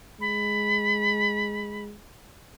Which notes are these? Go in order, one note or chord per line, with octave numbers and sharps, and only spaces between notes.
G#3 B5